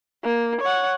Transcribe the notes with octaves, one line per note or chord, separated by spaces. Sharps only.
A#3
C#5 F#5